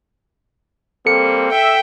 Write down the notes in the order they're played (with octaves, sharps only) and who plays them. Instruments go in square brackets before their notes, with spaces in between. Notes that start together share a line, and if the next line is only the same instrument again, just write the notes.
[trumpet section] G3 A#3 C4 [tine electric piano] A4 C#7
[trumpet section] E5 [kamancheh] G5